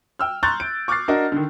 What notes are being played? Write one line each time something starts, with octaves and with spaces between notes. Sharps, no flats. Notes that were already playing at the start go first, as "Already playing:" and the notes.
G5 E6 F6
A#5 C6 C#6 F#6 G6 A6
D7
C#6 D6 F6 F#6 A6 C7
D4 F#4 A#4 D#5
D3 D#3